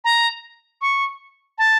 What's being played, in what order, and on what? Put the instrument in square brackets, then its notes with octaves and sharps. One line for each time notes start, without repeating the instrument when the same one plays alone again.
[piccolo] A#5
C#6
A5